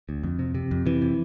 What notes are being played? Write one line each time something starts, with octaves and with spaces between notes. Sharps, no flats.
D2
F2
C3
C3
F2
C3 E3
C3